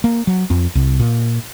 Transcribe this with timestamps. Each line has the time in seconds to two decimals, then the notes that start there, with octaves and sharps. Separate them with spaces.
0.04 A#3
0.27 F#3
0.50 F2
0.75 C2
1.00 A#2